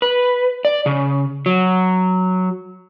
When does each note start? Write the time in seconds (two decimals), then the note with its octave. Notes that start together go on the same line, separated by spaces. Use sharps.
0.02 B4
0.65 D5
0.86 C#3
1.46 F#3